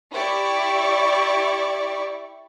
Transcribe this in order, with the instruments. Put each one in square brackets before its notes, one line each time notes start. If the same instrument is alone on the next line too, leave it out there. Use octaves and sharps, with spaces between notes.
[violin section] E4 G4 D5 C#6